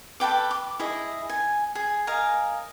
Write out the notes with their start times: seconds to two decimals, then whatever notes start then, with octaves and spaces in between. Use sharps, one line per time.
0.20 A4 B4 G5 D6
0.51 D6
0.79 E4 G#4 D#5
1.29 G#5
1.75 G#4
2.07 A#4 D#5 F5 G#5